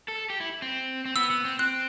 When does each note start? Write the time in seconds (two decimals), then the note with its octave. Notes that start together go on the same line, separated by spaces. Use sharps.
0.08 A4
0.30 G4
0.40 E4
0.62 C4
1.05 C4
1.16 B3 E6
1.31 B3
1.45 C4
1.59 C4 F#6